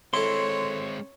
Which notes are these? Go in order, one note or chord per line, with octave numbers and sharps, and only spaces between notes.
G#3 C4 E4 A4 C#5 C6